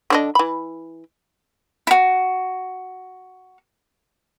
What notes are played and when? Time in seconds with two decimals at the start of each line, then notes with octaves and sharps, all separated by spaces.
0.10 D3 D4 D#5
0.35 E3 B5
1.87 E4 F#4